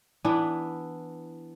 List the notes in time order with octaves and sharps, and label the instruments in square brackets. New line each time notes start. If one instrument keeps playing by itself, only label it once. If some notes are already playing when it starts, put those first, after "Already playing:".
[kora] E3 B3 D4 E4